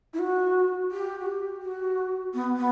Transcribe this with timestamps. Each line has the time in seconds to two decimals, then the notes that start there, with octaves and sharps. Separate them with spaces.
0.13 E4
0.19 F#4
0.91 G4
1.20 F#4
1.26 G4
1.62 F#4
2.34 B3
2.57 B3